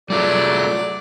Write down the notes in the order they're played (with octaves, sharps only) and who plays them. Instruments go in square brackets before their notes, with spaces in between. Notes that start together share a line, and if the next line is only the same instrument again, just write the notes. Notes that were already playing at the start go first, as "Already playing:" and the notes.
[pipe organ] F#3 A3 [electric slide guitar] G3 F4 G#4 [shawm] D5